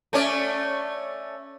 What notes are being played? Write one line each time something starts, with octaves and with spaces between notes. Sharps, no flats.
A3 C#4 D5